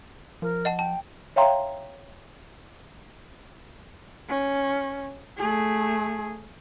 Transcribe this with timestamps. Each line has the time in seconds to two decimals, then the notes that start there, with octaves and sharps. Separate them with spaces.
0.42 F3 A#4
0.65 D#5 F#5 A5
0.79 G5 A5
1.36 C#5 E5 F5 G5 A#5 C6
4.29 C#4
5.38 A3 G#4